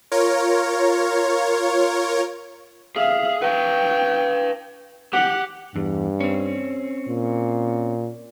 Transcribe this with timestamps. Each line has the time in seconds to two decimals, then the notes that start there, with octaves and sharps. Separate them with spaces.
0.12 F4 A#4 C#5
2.96 G#4 E5 F5
3.42 B4 F5 G5
5.13 G4 F#5
5.76 E2 G2
6.20 C4 C#4
7.08 A#2